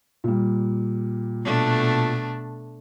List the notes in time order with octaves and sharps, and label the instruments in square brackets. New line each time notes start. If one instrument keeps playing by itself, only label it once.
[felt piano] A#2 G3
[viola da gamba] B2 A3 D4